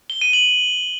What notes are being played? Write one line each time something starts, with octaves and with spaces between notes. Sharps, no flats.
G7
D#7
F#7